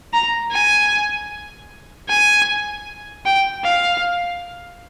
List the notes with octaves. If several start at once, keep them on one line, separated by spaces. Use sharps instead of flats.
A#5
G#5
G#5
G5
F5